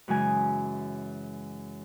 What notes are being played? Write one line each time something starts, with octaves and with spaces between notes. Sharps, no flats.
F#2 C#3 E3 G#3 G#5